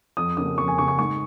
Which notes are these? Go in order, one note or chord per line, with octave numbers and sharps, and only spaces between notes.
F2 D#6
C#3 A#3 C#4 D#6
F2 C#6
G#5
C#3 A#3 C#4 C#6
C#6
G#2 C#6